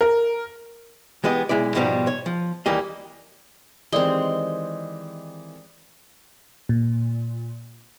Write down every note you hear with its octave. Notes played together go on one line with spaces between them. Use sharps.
A#4
E3 G#3 B3 G4 D#5
B1 G#3 E4 D5
G#2 B2 F3 G3 B3 D#4
C#5
F3
D#2 E3 G3 A#3 D#5
D#3 E3 G#3 C4 G4 D5 D#6 G7
A#2